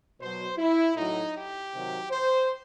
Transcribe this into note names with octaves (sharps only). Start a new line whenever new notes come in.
B2 F#3 C5
E4
A2 F#3 D#4
G4
C3 D#3 F#3
C5